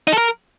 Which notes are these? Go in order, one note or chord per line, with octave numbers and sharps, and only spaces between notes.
D#4
A4
A#4